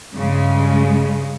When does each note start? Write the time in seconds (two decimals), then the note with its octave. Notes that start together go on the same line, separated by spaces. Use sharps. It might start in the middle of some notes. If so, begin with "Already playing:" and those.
0.12 G2 C#3 G#3